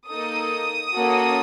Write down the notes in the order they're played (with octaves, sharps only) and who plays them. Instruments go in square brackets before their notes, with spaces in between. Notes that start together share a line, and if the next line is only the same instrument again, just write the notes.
[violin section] A#3 D#4 A4 D#6
A#3 C#4 F#4 A4